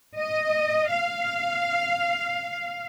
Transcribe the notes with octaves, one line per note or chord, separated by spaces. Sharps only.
D#5
F5